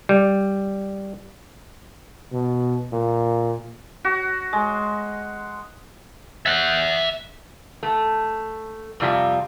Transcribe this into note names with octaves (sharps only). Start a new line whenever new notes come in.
G3
B2
A#2
F#4
G#3
E5 F#5
A3
F2 C3 G3 F4 E5